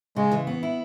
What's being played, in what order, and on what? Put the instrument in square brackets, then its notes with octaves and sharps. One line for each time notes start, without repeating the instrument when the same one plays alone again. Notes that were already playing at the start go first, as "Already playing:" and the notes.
[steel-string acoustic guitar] C#3 [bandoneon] G#3
[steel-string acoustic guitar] E3
B3
E4